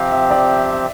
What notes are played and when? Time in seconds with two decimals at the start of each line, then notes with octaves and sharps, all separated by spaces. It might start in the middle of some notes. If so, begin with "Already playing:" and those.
Already playing: C3 F3 C4 G4 F5
0.11 E5
0.31 D5
0.51 E5
0.70 E5